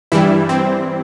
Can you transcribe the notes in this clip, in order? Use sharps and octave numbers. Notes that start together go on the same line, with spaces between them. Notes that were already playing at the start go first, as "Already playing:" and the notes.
G2 E3 G3 E4
C4